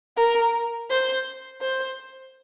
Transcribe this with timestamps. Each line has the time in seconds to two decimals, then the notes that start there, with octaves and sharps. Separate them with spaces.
0.17 A#4
0.90 C5
1.61 C5